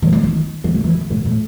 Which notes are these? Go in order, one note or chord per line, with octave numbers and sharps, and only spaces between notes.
D#3
E3
D#3
E3
D#3
E3
F#2
G#2
A2